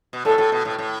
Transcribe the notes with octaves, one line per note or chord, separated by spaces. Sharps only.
B2
A2 A4
A2
B2
A2
A2